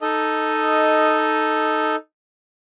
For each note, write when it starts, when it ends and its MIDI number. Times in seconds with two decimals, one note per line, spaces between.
0.01 1.96 63
0.01 1.96 69
0.01 1.96 75